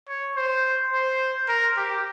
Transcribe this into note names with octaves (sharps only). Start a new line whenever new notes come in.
C#5
C5
C5
A#4
G4